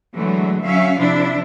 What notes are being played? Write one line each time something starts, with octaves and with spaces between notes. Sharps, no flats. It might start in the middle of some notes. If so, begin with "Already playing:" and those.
D3 E3 F#3 G#3 A3
F#3 C#4 E5 F5
C3 F3 D4 E4